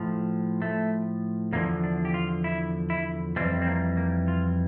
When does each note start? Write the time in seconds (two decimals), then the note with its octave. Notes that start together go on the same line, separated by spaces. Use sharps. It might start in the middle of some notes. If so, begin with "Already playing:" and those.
Already playing: A2 F3
0.62 A3
1.53 E2 D3 F3 A#3
1.84 D4
2.05 G4
2.14 F4
2.44 E4
2.90 E4
3.36 F2 E3 G3 C4
3.62 C4
3.67 A#3
3.97 A#3
4.28 F4